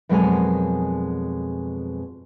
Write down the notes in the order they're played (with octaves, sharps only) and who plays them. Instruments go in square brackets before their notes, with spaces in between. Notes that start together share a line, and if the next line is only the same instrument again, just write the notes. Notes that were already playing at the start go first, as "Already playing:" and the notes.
[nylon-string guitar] F2 B2 F#3 G#3 A#4 G#5